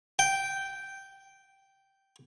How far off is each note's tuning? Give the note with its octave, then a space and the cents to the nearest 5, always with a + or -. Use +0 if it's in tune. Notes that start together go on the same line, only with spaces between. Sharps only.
G5 -5